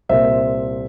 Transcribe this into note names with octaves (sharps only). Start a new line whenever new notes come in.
C2 A#2 C5 E5